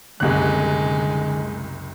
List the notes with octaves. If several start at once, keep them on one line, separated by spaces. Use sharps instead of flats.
F#1 C2 D3 G#3 F#6